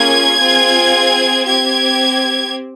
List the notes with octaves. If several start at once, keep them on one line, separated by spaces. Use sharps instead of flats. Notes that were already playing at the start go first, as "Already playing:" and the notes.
Already playing: A#3 C#4 F4 G#4 G#6
C4 F4 G#4
C4 G4 G#6